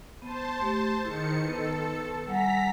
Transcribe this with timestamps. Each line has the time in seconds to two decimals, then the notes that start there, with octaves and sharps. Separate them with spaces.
0.22 B3 C5 A5
0.61 A3 G4
1.05 D#3 E4 G#4 C#7
1.45 B3 A4 B4
2.27 G3 F#5 G#5 A#5 B6